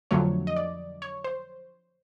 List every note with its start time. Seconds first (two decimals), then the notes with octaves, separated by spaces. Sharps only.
0.11 F2 D3 F#3 A3 C#5
0.47 D#5
0.57 D5
1.02 C#5
1.24 C5